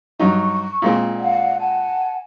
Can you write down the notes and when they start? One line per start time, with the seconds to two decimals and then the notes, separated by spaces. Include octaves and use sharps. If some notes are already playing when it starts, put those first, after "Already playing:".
0.19 G2 F#3 D#4 C#6
0.82 A#2 G#3 C4
1.19 D5 F5 F#5
1.58 F#5 G#5 A5